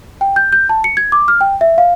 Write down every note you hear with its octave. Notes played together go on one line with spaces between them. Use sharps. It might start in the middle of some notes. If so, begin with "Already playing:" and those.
G5
G6
G6
A5
C#7
G#6
D6
F6
G5
E5
F5